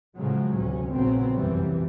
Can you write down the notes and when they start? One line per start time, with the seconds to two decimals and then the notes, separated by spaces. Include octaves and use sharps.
0.16 A2 C#3 F3 F#3 G#3
0.55 A1 D2 C3 C#4
0.92 A#1 C#3 F#3 B3 C4
1.34 F1 F#2 E3 G3